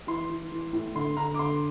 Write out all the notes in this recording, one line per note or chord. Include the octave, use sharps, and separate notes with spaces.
E3 C6
E3
E3
A2
D3 C6
D3 A#5
D6
D3 C6